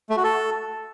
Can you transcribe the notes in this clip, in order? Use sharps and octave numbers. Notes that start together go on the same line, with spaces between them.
A3
F#4
A4